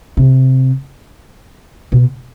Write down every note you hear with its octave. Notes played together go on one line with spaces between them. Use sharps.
C3
B2